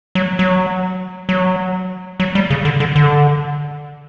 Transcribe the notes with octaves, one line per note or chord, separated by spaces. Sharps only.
F#3
F#3
F#3
F#3
G3
C#3
D3
D3
D3